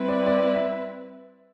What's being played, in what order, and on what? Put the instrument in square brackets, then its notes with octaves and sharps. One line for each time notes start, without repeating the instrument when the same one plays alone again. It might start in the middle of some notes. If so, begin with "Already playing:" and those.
Already playing: [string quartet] G3 C4 E4 B4
[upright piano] D5
D5
E5